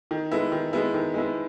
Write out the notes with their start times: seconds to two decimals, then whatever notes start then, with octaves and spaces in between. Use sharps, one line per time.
0.11 D#3
0.32 G#3 B3 E4
0.52 D#3
0.73 G#3 B3 E4
0.94 D#3
1.14 G#3 B3 E4